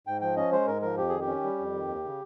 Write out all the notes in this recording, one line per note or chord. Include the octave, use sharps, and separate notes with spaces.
G#2 G5
F3 G5
C#4 D#5
G#3 C5
G#2 A#4
F3 A#4
F2 G4
D#3 G#4
G4
C#4
G3
F2
D#3
D#2
C#3